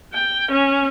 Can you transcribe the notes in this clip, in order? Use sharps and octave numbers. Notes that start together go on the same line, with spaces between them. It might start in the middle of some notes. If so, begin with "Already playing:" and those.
G5
C#4